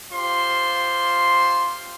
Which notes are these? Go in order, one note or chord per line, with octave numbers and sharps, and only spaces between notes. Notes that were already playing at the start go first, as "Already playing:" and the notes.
F4 G4 C5 C6